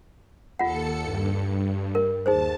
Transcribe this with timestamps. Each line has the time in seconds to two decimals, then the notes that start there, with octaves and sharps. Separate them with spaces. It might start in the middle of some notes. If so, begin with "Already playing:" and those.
0.59 D#2 F4 A4 F#5 C#7
1.03 G2
1.95 A#4
2.26 D#2 D#4 G#4 C5 A5